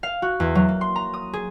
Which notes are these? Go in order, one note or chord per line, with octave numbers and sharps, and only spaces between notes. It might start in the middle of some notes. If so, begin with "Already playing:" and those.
F5
F#4
E2
F#3
A#3
C6
A#5
D#6
G#4